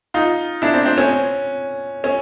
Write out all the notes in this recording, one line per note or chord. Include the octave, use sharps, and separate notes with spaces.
D#4 F4
D4 E4
C4 D4
C4 D4
C#4
C#4